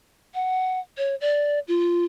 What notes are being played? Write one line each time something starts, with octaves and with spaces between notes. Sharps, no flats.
F#5
C#5
D5
F4